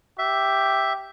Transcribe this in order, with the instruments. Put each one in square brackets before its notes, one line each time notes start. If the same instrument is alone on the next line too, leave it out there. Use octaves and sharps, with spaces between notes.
[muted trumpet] G4 [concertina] E5